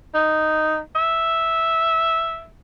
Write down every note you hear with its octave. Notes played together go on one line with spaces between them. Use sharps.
D#4
E5